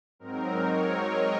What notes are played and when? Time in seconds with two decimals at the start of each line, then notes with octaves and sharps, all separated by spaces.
0.19 G#2 F#3 C4 D#4 A#4
0.62 C#5
1.04 D#5